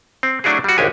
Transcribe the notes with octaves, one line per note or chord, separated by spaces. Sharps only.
C4
F#3 A3 D4 E4 F#4 G#4
G3 F#4
G#1 C#2 G#3 D4 G4 G#5